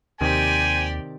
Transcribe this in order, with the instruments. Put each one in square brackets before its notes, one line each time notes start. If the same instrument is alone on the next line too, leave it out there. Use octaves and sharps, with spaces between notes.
[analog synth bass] D#2 [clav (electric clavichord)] C3 D#3 [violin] G4 D5 [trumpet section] C5 G#5